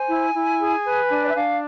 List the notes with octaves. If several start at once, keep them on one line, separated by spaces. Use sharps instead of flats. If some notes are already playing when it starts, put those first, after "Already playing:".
Already playing: C5 G#5
E4
E4
G#4
B4
D4
D5
E5
D4 F5